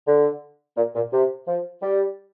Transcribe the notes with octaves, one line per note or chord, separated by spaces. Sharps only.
D3
A#2
A#2
C3
F3
G3